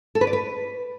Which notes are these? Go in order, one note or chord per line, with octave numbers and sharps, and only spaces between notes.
A4
B4
D5
B4